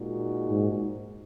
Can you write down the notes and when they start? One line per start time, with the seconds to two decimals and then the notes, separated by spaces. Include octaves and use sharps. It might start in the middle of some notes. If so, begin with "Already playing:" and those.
Already playing: A#2 G#3 D#4 F#4
0.50 G#2